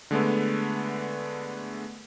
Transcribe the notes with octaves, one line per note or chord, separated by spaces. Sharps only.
D3 G#3 A3 B3